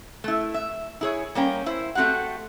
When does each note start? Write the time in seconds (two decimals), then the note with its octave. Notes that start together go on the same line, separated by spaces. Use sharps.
0.24 A3 E4
0.54 E5
1.01 E4 G#4 C#5
1.35 G3 A#3 C#4 G5
1.66 E4 C5
1.95 A3 C4 F#4 G4 F#5